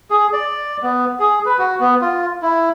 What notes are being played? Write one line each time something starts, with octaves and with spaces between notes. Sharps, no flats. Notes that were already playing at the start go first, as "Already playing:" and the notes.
G#4
D5
B3
G#4
B4
F#4
B3
F4
E4